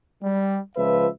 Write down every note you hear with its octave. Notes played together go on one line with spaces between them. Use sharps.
G3
C#2 F3 B4 E5